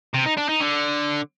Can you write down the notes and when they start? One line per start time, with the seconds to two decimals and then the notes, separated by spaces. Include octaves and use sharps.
0.14 C3
0.26 D#4
0.37 D4
0.49 D#4
0.60 D3